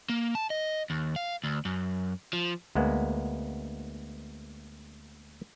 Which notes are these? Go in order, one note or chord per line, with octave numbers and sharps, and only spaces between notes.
A#3
A5
D#5
D#2
F5
D2
F#2
F3
D2 G#3 A#3 B3